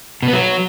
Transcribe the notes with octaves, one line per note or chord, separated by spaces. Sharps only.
B2
B3
F#3